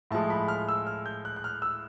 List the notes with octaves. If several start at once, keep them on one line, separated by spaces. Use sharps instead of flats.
A2 F3 G#3 A5
B5
F6
E6
F6
G6
F#6
F#6
F6
E6